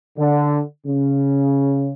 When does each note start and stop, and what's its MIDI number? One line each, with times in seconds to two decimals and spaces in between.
0.18 0.60 50
0.86 1.92 49